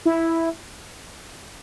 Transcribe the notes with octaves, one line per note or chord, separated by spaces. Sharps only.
E4